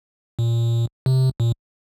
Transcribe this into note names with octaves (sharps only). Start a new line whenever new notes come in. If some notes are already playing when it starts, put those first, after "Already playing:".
A#2
C3
A#2